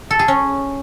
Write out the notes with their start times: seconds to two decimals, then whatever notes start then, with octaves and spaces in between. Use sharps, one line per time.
0.11 A4
0.19 G#4
0.28 C#4